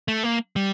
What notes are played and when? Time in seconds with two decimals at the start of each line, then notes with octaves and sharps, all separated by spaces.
0.08 A3
0.24 A#3
0.56 G3